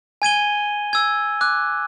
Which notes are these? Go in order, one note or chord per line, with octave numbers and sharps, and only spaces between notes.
G#5 G#6 D#7 G7
E6 G#6
D6 F#6